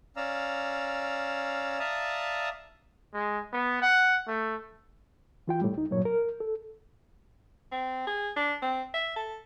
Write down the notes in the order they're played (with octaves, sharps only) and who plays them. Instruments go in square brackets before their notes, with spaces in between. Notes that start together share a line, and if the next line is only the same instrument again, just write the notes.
[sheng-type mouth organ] C#4 D5 F5 A#5 E6
D5 E5 F5 A5 A#5 D#6
[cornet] G#3
B3
F#5
A3
[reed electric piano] E3 F4 G5
A2 G3
C#2 D#4
G2 A#2 F#3 C#5
A#4
A4
[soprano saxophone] C4
G#4
D4
C4
E5
A4